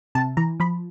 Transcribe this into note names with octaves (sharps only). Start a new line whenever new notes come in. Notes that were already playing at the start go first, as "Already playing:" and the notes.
C3 A5
E3 A#5
F3 B5